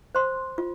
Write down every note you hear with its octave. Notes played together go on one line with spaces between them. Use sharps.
C5 C6
F4